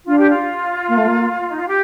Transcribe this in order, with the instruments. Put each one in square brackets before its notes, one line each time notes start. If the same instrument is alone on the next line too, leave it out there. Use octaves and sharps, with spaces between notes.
[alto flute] D4 [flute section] F4
[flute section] G4
F4
[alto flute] A#3
A3
A#3
[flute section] D#4
F4
G4